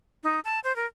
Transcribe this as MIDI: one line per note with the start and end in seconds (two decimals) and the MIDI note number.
0.24 0.40 63
0.45 0.60 81
0.64 0.75 72
0.76 0.86 70